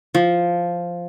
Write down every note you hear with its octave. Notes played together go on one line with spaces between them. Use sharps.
F3